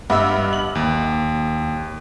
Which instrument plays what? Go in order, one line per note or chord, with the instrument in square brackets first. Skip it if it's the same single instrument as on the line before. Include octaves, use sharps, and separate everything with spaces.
[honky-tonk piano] G2 E5 E6 [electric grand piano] D#5 F#5 D6
[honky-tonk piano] F#7
[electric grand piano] D#2